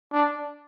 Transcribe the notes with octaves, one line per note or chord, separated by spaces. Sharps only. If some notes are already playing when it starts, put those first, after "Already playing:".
D4